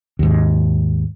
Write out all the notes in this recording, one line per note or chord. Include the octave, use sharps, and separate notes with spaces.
D#2 G#2